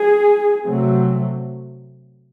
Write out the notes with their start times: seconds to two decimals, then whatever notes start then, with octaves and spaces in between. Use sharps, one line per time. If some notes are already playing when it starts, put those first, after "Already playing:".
Already playing: G#4
0.65 C3 F#3 A3 C4